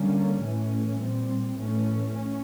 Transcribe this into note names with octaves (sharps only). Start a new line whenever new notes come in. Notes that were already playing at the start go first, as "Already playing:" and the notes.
Already playing: D3 G3 A#3 C#4
A2 E3 A3 C#4
A#2 G3 C4
A2 E3 A3 C#4
C#4